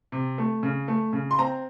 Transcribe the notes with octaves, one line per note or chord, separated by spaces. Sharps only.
C3
A3
C#3
A3
C#3
C6
C4 A#5